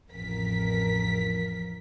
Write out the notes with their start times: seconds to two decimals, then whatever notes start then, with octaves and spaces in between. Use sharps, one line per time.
0.11 A1 F2 A#4 B6